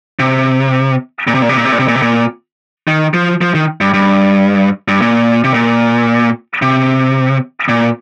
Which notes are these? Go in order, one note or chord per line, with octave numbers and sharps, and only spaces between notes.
C3
A#2
C3
A#2
C3
A#2
C3
A#2
C3
A#2
C3
A#2
D#3
F3
F3
D#3
G2
G2
G2
A#2
C3
A#2
C3
A#2